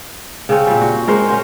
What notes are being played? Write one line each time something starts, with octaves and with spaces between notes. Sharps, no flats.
C#3 C4 C#4
A#2 G3
F#4
G#3 A#4 C5 F#5
C#4 F#4 C5